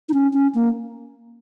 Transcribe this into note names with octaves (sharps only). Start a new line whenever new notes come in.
D#4
C#4
C#4
A#3